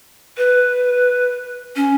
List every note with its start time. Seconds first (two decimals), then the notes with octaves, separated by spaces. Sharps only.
0.38 B4
1.76 C#4